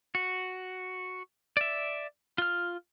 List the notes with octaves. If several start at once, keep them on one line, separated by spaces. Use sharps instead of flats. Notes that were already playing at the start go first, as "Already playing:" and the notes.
F#4
D5 E5
F4 F6